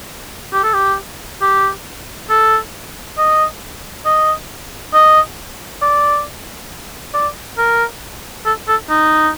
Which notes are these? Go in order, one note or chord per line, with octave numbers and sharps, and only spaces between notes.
G4
A4
G4
G4
A4
D#5
D#5
D#5
D5
D5
A#4
A4
A4
D#4